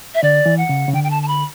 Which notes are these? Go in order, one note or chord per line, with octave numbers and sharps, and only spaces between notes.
E5
D3 D5
E3
F#5
C#3
C#3
D3 G5
G5
A5
A5
B5